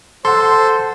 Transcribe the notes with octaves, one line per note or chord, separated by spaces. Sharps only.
A4 C5 F#5 C6